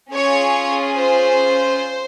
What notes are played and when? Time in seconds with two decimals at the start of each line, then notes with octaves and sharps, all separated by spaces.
0.12 C#4 F4 G#4 C#5
0.96 C5